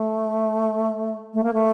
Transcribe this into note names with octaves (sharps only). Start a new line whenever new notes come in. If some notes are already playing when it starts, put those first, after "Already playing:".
Already playing: A3
A3
A#3
A3